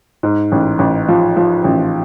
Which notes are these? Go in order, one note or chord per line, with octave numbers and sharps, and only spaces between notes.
G#2
A1
A1
F3
F3
A1